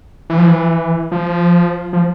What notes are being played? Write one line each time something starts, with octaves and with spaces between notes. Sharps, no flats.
E3
F3
E3
F3
F3